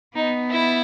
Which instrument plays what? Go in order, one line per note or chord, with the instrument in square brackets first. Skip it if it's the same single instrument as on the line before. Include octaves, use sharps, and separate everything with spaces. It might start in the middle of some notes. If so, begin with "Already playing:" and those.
[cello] B3 [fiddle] D#4
[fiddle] E4